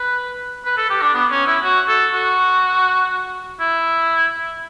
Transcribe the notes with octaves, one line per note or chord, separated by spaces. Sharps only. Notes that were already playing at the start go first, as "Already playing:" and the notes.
Already playing: B4
B4
A4
G4
D4
B3
C#4
E4
F#4
A4
F#4
E4